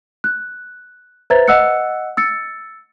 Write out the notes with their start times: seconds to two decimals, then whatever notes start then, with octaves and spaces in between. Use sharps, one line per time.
0.24 F#6
1.30 B4 C5 E5 A#5 G#6 A6
1.48 D#5 F#5 E6 F#6 C#7
2.17 E6 A6 C#7